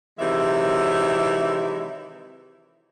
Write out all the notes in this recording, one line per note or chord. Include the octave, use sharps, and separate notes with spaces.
C3 D#3 E3 F#3 G#3 E5